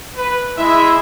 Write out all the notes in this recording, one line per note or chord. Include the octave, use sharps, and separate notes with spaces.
B4
G#3 E4 E5